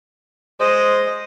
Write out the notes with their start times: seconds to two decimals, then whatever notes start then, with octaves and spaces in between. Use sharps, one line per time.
0.60 G#3 C5 D#5